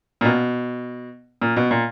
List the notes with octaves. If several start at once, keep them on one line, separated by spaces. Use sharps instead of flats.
A#2
B2
A#2
B2
A#2